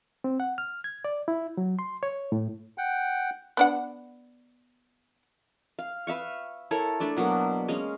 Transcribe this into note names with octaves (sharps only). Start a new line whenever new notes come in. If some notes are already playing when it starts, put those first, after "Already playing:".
C4
F#5
F6
G#6
D5
E4
F#3
C6
C#5
A2
F#5 G5
B3 D4 F#5
F5
B4 E5 F5 C#6
E4 A4 A#4 C#5
A3 D4 D5
B2 F#3 A#3
G#3 C#4 F5